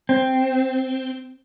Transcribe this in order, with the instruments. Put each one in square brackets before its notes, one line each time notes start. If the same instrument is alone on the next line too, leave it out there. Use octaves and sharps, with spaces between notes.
[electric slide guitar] C4